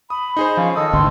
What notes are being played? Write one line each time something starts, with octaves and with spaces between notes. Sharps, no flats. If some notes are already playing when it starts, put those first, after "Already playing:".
B5 D#6
D#4 G#4 C5
F3 C#4 F5
D#3 A4 D#5 D#6
G#1 D2 D3 C6